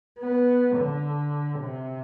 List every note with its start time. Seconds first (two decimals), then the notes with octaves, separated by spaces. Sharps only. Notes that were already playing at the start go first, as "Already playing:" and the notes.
0.19 B3
0.76 D3
1.61 C3